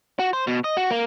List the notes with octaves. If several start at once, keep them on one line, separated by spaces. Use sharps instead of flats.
F#4
C5
B2
D#5
F#4
A#3